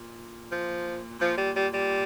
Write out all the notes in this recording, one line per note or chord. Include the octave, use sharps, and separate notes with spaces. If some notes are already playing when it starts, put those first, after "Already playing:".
Already playing: A#2
F3
A#2 F3
G3
G3
G3